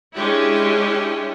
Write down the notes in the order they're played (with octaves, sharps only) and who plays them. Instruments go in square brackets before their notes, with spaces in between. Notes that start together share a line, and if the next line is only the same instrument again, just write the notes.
[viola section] G#3 C#4 D4 E4 G4